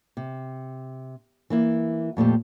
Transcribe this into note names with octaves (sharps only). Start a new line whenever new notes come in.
C3
E3 A#3 E4
F2 A#2 A3 G4